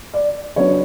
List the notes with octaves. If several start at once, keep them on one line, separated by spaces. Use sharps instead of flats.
D5
C#3 F#3 B3 D4 C#5